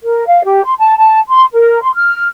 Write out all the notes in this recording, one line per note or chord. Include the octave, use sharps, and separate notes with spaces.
A#4
F5
G4
C6
A5
A5
C6
A#4
C6
F6